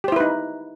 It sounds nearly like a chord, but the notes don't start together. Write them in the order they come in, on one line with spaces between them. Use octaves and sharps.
G4 C5 E4 B4 D#4